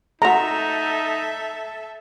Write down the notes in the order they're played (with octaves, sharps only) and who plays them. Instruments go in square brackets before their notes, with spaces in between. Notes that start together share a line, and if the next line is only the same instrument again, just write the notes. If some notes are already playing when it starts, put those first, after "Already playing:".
[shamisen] A3 F#4 [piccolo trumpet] D#4 [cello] A4 E5 [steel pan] A#5